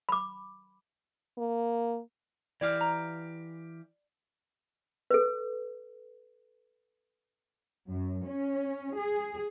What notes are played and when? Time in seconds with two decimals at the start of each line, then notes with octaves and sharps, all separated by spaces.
0.09 B5 D6
1.38 A#3
2.61 E3 G4 D5 F5
2.81 A#5
5.11 A4 B4
7.89 F#2
8.25 C#4
8.95 G#4